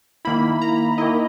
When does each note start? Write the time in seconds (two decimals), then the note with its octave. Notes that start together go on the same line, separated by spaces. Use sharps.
0.25 D#3 A#3 E4 B5
0.62 A#5
0.98 D#3 A#3 E4 D#5